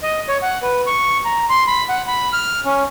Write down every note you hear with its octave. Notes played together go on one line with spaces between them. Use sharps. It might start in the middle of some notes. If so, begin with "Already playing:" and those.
D#5
C#5
F#5
B4
C#6
A#5
C6
B5
F#5
B5
F6
C#4